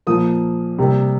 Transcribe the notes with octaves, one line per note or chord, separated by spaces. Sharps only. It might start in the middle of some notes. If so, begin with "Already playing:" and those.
A#2 F3 A#3 D#6
C3 G3 A#3